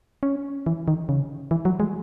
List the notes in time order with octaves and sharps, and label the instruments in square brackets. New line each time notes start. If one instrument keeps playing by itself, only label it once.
[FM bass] C#4
E3
D#3
C#3
E3
F#3
G#3